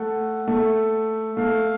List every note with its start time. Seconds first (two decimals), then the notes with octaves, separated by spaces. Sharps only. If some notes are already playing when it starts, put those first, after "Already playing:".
Already playing: A3 F#5
0.48 A3
1.36 A3 F5